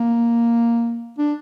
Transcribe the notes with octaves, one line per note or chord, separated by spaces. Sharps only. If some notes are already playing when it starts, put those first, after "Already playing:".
Already playing: A#3
D4